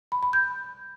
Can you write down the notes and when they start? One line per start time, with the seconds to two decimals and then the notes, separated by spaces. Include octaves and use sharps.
0.12 B5
0.23 B5
0.33 G6